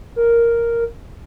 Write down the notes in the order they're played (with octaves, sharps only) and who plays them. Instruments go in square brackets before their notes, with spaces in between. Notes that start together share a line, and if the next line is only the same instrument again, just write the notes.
[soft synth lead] A#4